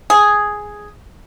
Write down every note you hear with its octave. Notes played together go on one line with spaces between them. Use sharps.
G#4